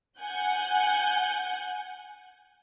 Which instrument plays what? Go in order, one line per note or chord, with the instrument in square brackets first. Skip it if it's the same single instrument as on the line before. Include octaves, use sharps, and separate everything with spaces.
[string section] F#5 G#5 G6